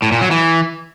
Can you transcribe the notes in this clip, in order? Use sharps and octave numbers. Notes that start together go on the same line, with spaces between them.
A2
A#2
F#3
E3